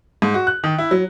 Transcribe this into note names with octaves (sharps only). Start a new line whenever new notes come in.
G#2
F#4
F#6
D#3
E4
F#3